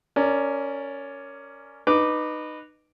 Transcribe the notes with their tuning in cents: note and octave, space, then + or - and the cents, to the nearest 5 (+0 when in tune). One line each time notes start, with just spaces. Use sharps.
C#4 +10 A#4 -20 D5 +0
D#4 -20 B4 +0 D6 +0